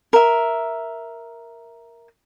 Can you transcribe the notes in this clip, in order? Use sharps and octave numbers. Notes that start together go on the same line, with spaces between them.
A#4 E5